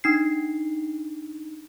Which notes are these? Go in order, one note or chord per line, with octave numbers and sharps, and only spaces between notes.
D4 D#4 C7